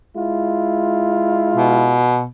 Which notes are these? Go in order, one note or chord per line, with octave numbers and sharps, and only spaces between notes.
G#3 E4 F4
B2